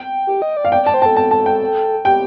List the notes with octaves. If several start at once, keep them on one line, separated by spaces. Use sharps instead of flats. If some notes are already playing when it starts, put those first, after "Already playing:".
Already playing: G5
G4
D#5
D5
F5
D5 G5
D5 A5
C5
A4 A5
A5
A5
G5
G4 G5